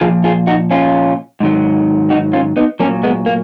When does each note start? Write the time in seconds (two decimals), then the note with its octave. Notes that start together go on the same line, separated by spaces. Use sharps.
0.01 A#2 F3 F4 G#4
0.24 F4 G#4
0.47 D#4 F#4
0.71 C#4 F4
1.40 G#2 D#3 F#3
2.10 D#4 F#4
2.33 C#4 F4
2.57 B3 D#4
2.80 F#3 A#3 C#4
2.83 A#2
3.03 G#3 B3
3.26 A#3